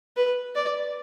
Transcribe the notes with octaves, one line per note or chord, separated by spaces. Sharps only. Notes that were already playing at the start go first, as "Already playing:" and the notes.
B4
D5